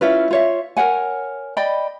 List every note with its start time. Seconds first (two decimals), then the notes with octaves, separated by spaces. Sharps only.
0.01 C#4 E4 F4 B4
0.31 F4 C#5 E5
0.77 A#4 C#5 F#5 G#5
1.57 D5 D#5 G5 B5